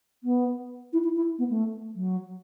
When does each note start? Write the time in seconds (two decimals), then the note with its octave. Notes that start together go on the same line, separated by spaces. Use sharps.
0.24 B3
0.93 E4
1.04 E4
1.16 E4
1.39 B3
1.50 A3
1.95 F#3